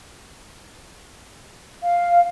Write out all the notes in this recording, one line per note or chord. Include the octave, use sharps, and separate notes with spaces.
F5